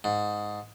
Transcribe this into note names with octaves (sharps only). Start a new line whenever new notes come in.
G#2